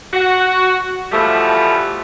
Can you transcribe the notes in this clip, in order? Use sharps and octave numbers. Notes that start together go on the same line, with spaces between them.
F#4
B2 E3 F3 G3 A3 B3